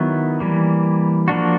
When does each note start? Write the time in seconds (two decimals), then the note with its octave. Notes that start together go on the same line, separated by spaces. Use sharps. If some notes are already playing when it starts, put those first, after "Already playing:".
Already playing: D#3 F#3 B3 E4
0.40 E3 G3 A#3
1.28 F3 A#3 D4 F#4